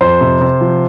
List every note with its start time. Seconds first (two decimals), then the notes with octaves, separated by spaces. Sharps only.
0.01 F2 C5
0.21 C3
0.41 C3
0.61 F3